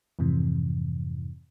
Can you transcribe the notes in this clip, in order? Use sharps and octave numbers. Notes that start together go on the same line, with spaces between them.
F2 G#2 C3 E3